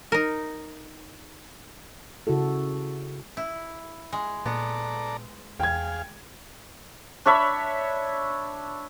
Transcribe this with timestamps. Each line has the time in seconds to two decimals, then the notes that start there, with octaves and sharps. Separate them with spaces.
0.12 D#4 A#4
2.27 C#3 E4 F#4 A4
3.37 E4
4.13 G#3
4.46 A#2 B3 A4 D5 A#5
5.60 E2 G#4 F5 G5 G#6
7.26 D4 C#5 E5 B5